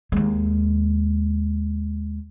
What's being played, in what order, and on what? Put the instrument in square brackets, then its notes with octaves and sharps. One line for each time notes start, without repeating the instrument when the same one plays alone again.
[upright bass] D#2 G#3